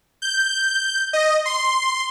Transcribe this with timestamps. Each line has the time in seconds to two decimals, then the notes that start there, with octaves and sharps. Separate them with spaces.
0.22 G6
1.13 D#5
1.45 C6